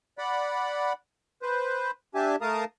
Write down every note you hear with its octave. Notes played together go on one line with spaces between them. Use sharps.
D5 F#5 B5
B4 C5
D4 G4 E5 G#5 A5
A3 A#4 F5 A5 A#5 D#6